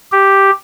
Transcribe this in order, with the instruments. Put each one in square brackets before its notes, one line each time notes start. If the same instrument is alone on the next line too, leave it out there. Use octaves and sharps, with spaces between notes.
[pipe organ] G4